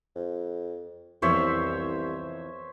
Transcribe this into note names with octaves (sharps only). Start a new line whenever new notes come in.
F2
C2 F2 E3 B3 C5 C#5 E5